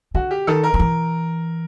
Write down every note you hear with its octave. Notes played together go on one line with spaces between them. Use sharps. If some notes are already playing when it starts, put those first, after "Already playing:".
D3 F#4
G4
D#3 A4
A#4
D#3
E3